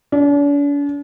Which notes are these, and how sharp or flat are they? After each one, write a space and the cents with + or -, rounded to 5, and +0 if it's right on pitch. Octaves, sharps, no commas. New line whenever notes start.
D4 -45